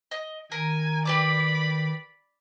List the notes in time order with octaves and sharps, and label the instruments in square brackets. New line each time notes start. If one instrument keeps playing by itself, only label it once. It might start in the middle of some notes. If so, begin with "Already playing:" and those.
[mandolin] D#5
[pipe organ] D#3 [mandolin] A#4 [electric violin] G#5
[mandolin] G4 B4 D6 [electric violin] D5 B5